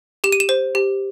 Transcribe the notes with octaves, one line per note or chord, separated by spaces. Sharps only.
G4 E7
D#7
E7
C5
G4